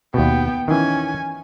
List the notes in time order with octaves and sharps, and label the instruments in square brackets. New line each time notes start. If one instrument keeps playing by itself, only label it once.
[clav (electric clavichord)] D#2 B2 [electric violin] B3 G5
[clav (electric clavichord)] D#3 E3 [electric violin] C#4 G#5